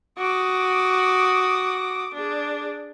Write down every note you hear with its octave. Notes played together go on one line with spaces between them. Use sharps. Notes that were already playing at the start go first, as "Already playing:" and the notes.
F#4 D6 D#6
D4 G#4